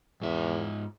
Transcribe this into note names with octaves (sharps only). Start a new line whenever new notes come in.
E2 G#2 E5